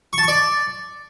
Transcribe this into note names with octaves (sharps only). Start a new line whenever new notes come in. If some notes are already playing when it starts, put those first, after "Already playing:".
C#6
A5
C#6
D5